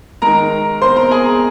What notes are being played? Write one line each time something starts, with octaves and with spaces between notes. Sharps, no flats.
D#3 G#3 A#4 A#5
C5 C6
A#4 A#5
G#4 G#5